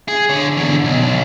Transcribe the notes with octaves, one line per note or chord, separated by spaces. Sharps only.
G#4
D3 C#5
E2 D3
B1
B1